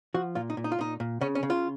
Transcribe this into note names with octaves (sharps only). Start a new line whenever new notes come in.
F3 F#4
A#2 F4
D#4
A#2
D#4
F4
A#2 D#4
A#2
C#3 C#4
C#4
C#3
F4